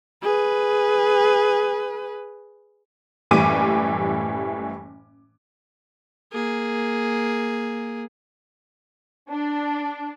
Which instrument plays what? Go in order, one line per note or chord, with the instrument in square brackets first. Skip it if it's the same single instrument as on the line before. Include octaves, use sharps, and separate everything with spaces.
[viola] G#4 B4
[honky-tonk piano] F#1 A2 E3 G3 D6 D#7
[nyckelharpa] A#3 G#4
[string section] D4